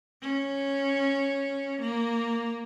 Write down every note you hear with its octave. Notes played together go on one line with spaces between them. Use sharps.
C#4
A#3